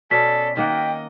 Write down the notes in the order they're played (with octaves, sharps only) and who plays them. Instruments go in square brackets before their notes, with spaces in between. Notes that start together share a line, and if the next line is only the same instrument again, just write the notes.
[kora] B2 C#4 [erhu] A4 [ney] D5 [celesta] B6
[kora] D#3 A#3 F#5 [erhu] D#5 [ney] G5